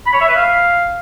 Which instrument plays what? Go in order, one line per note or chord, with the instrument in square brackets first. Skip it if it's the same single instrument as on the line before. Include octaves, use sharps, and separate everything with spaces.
[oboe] B5
C#5
E5
B4
F5